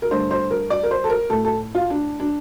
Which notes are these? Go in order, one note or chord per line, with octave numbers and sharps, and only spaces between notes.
A#4
G2 D3 A3 C5
C5
A#4
D5
A#4
C5
A4
A#4
A2 A3 A4
A4
F4
D4
D4